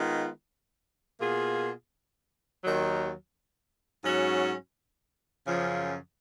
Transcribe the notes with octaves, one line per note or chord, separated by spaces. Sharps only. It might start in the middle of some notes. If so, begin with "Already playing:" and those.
Already playing: D#3 G#3 B3 F4
B2 A#3 F4 G#4
D#2 D#3 F#3
G#2 F#3 C#4 F#4
F#2 C#3 F3